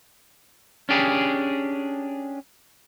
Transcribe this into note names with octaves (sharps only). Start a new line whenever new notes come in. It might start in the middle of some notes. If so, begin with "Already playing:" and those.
C#4 D4 G4 G#4